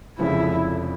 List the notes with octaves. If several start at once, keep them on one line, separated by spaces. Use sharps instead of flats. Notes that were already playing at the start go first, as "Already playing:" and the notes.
F1 F2 C#3 F3 G#3 E4